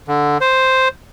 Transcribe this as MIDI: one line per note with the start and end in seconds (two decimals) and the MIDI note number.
0.08 0.38 50
0.41 0.88 72